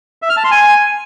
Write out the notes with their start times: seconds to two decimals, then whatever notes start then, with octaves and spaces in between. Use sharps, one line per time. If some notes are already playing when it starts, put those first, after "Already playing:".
0.22 E5
0.29 F6
0.37 A5
0.44 C6
0.51 G#5